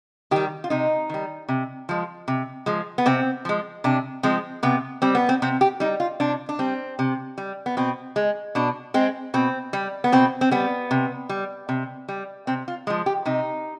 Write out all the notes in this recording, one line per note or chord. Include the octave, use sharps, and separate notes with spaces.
D#3 G3 G4
F4
C3 D#4
D#3 G3
C3
F3 G#3
C3
F3 G#3
B3
C3 C4
F3 G#3
C3 D4
F3 G#3 C4
C3 B3
G3 C4
B3
C4
C3 C4
G4
G3 D#4
F4
C3 D4
D4
G3 C4
C3
G3
B3
B2 C4
G#3
B2 D4
G#3 C4
B2 C4
G3
B3
B2 C4
C4
G3 B3
C3
G3
C3
G3
C3 C4
F4
F3 G#3
G4
C3 D#4